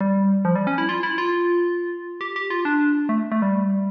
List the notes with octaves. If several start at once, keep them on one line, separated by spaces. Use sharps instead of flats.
G3
F3
G3
C#4
E4
F4
E4
F4
G4
G4
F4
D4
A3
A3
G3